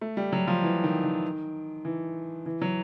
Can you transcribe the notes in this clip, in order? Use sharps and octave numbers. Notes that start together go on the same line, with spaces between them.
A3
G3
F#3
F3
E3
D#3
D#3
E3
E3
F#3